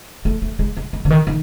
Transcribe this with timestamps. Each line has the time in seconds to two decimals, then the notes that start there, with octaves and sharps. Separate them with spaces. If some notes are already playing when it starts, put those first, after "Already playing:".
0.25 A3
0.42 A3
0.59 G#3
0.77 G#3
0.93 G#3
1.05 D3
1.10 D#3
1.27 D#3